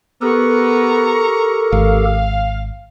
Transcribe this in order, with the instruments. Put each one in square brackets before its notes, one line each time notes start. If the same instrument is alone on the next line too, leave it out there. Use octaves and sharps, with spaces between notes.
[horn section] B3 [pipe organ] G4 A4 A#4 [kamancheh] A#5 C#6
[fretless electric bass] G#1 [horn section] F5